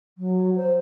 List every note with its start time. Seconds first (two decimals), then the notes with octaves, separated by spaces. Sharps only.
0.18 F#3
0.56 C5